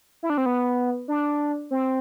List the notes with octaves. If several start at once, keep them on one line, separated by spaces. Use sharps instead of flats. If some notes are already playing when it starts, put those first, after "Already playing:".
E4
D4
C4
B3
D4
C4